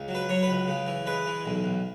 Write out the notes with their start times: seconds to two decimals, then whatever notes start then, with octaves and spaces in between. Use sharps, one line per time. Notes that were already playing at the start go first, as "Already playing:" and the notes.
Already playing: C#2
0.08 F#3
0.15 B4
0.29 F#3 C#5
0.43 B4
0.48 C#2
0.68 C#3
0.86 E3
1.06 G#3 B4
1.26 E3
1.46 B1
1.64 B1